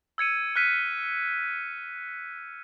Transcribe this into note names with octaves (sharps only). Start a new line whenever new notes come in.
E6 G#6 C#7 D#7
F6 F#6 B6 D#7